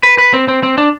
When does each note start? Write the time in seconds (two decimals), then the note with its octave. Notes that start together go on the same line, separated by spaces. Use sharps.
0.03 B4
0.18 B4
0.34 C4
0.48 C4
0.63 C4
0.78 D4